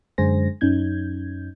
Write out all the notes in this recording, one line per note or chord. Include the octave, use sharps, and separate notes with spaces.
F#2 D3 G#3 C5 G#5 A#6
F#2 C#4 D#4 G6 G#6